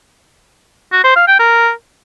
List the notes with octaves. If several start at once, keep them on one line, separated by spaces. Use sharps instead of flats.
F#4
C5
F5
G5
A#4